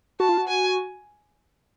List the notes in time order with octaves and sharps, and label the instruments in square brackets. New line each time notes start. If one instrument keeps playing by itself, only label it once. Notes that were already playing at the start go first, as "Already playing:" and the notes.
[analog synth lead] F#4 [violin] A5
[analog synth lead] F4
F#4
[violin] G#5